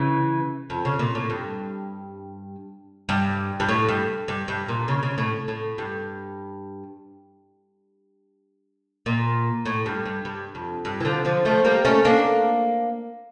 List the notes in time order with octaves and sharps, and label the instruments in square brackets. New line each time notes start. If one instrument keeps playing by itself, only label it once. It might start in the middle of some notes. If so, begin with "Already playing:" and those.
Already playing: [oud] C#3 E3
F2
C#3
A#2
A2
G2
G2
G2
A2
G2
G2
G2
A#2
C#3
C#3
A2
A2
G2
A#2
A2
G2
G2
G2
F2
G2
E3
D3 F3
D3 F3
F3 A3
G3 A#3
A3 C#4
A#3 D4